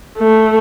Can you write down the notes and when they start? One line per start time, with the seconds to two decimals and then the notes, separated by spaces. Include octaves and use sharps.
0.18 A3